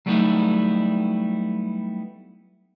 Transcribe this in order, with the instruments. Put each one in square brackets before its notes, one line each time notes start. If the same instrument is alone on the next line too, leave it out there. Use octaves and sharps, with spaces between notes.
[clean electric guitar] F#3 G3 A3 B3 D#4 E4